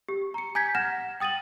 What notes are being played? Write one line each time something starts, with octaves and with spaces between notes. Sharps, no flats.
G4
A#5 C#7
G#5 A#5 G6 G#6 B6
F#5 F6 A#6 E7
G5 D#6 A6 D#7 F#7